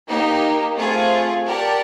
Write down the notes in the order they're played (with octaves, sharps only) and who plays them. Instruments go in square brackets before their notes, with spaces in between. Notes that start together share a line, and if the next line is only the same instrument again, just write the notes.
[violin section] A#3 D#4 G4
A3 C4 F4 G#4
G4 A#4 D5 F#5 A5